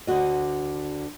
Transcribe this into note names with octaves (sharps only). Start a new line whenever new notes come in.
D2 D3 D4 F#4 D#5